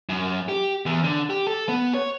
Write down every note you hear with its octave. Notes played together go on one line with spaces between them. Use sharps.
F#2
G4
E2
D3
G4
A4
B3
C#5